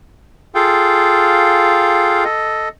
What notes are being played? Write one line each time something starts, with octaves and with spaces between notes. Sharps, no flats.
F4 G#4 A4 F5 G5
A4 D#5